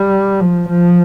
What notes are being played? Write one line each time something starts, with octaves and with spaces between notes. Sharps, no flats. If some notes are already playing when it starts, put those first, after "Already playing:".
Already playing: G3
F3
F3